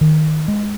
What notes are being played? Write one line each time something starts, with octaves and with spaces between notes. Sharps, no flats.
D#3
G#3